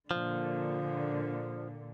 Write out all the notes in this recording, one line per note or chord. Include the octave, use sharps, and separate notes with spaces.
A#2 D3 F3